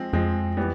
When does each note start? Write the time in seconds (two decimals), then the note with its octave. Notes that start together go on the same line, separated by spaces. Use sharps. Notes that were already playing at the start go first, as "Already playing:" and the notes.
Already playing: F3 G#3 C4
0.13 F2 F3 G#3 C4
0.57 E3 G3 B3